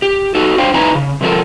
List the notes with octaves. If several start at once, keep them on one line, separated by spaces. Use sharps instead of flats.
G4
D#4 F#4 A4
D4 C5 F5 G5
D#4 E4 B4 G#5 A#5
C#3
C3 F3 A3 A4 A#4